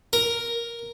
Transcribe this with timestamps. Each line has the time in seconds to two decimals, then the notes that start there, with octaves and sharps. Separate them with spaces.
0.13 A#4